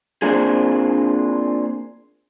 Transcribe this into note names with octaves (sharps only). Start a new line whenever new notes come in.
A#3 C4 D4 F4 G#4